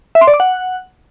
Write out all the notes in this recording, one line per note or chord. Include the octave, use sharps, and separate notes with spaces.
E5
C6
D5
D6
F#5